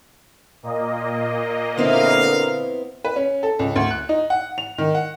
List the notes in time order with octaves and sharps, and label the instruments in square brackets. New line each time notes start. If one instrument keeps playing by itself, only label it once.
[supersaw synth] A#2 A#3 D#5
[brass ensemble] D3 A#4 F5 [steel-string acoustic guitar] B3 C4 E4
[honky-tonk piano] B4
C#4
A4
C#2
D2
F#6
D#4
F#5
F7
D#3
F#5